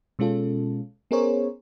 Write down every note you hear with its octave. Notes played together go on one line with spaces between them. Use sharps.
B2 G#3 C#4 F4 A4
B3 C#4 G#4 A#4 C5 C#5